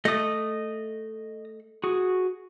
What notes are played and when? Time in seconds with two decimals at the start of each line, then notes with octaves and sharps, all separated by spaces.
0.05 A3 D#5 D#6
1.84 F#4 G#4